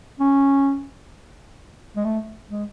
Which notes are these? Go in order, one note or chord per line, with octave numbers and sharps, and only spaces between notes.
C#4
G#3
A3
G#3